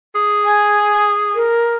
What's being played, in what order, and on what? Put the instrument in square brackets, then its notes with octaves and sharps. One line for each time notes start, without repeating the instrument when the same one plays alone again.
[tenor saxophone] G#4
[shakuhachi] G#5
A#4